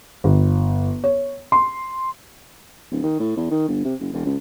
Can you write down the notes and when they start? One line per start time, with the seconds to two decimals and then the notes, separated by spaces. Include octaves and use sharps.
0.24 G1
1.04 C#5
1.52 C6
2.91 D1
3.03 D#3
3.20 A2
3.37 E2
3.51 D#3
3.68 G1
3.85 C3
4.00 F#1
4.13 E1
4.25 C#2